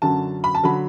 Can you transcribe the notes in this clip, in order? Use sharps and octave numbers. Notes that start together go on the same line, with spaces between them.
F#2 D3 F#3 A5
B5
A5
D3 F#3 B5